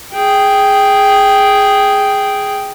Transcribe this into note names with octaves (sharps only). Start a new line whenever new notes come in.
G#4 G5